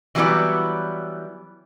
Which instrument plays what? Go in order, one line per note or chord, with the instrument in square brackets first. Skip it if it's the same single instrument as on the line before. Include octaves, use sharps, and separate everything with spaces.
[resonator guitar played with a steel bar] E3 F#3 G3 B3 E4 D5